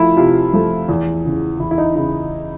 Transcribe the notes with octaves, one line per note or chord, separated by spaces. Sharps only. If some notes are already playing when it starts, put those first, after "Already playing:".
Already playing: F3 A3 E4
C3 F4
F3 A3
E2
C#3 E3
E2 E4
E4
D#4
C#3 E4